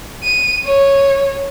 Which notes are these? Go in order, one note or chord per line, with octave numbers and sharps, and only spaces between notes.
D#7
C#5